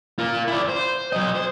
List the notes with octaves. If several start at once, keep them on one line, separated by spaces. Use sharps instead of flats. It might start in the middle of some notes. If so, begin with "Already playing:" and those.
F4 A#4
E4 D5
C5
F#3 D#5
C5